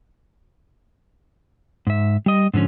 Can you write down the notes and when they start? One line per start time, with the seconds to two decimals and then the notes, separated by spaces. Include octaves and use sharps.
1.87 G#2 E5
2.26 G3 D#5
2.54 G#2 D3 F3 C#4